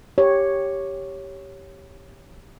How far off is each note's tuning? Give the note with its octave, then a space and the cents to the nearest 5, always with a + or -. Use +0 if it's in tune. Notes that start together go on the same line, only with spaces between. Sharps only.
G4 +0 C#5 +0